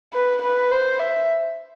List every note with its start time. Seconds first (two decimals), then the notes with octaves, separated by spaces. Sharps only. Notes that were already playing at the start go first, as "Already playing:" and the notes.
0.13 B4
0.42 B4
0.71 C5
0.99 E5